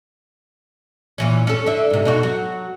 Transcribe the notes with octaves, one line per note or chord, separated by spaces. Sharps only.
A#2 E3 C#4
C#4 A4
D3 E5
G#2 C3
B2 D#4 F#4
F#3 F#4